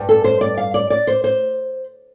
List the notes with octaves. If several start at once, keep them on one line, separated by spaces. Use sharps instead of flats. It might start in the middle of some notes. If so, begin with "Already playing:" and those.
Already playing: G2 G3
A4
C5
D5
F5
D5
D5
C5
C5